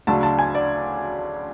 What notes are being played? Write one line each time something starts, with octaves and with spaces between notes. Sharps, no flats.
D2 C#3 F#3 A3 D4 A5
A5
G#5
D5